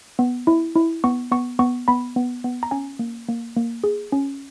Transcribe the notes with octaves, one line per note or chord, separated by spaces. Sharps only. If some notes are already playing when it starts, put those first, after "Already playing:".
B3
E4
E4
B3 C#6
B3 C#6
B3 C#6
B3 B5
B3
B3
A#5
C#4 G#5
A#3
A#3
A#3
G#4
C#4